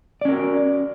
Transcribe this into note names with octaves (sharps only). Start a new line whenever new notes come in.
C#4 F#4 A#4 D5